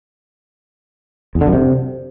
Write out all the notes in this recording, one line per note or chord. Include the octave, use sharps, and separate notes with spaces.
E2
D3
F#2
C3